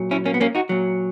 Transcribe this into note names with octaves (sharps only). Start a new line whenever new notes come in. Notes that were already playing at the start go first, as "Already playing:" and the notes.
Already playing: A#2 F#3
C#4 E4
A#3 C#4
B3
A#3 C#4
D#4 F#4
A#2 F#3